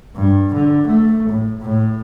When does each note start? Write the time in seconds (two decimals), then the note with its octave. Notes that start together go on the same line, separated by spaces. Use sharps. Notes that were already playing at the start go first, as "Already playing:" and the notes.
0.16 G2
0.54 D3
0.87 A3
1.30 A2
1.61 A2